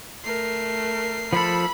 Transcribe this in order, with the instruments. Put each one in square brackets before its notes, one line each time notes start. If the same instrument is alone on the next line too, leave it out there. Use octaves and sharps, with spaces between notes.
[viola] A3 A#4 [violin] C7
[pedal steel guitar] F3 A4 [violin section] B5